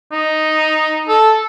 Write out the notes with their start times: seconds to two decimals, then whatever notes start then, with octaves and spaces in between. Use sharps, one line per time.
0.12 D#4
1.09 A4